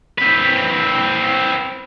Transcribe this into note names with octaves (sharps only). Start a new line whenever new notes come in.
C4 B4